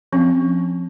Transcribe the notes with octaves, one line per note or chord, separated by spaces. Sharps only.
F3 C4 C#4